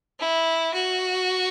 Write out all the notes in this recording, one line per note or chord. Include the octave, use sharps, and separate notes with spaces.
E4
F#4